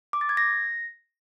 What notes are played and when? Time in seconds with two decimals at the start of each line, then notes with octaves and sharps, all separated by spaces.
0.13 D6
0.21 A6
0.29 G#6
0.37 A#6